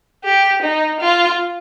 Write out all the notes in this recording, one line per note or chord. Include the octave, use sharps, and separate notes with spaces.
G4
D#4
F4